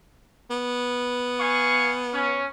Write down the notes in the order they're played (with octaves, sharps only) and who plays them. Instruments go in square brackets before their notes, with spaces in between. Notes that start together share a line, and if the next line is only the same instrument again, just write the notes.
[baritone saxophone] B3
[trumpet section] F5 G#5 C#6
C#4